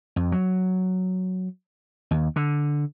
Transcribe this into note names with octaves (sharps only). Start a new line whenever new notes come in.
F2
F#3
D#2
D3